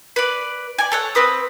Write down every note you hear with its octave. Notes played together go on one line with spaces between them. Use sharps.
B4 D5
D5 G#5
A4 C#5 F#5
C4 B4 D#6